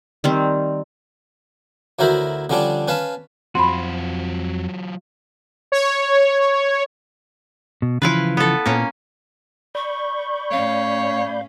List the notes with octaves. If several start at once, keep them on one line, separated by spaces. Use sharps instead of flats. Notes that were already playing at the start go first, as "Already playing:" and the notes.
D#3 G3 C4
D2 F#3 E4 A#4 C5 B5
D3 F3 G3 C#4 D4 D5
C#4 B4 F5 A5
F2 F#3 C4 F4 F#4 B5 C6
C#5
B2
C#3 E3 F3 E4 F4 B4
B3 A4
A#2 A#3 B3 C#4
D5 B5 C#6 G6
A2 C#4 C#5 F5